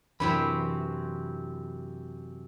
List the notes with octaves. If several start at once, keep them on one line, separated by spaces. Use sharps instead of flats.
F#2 C3 E3 C4 D4 E4 B5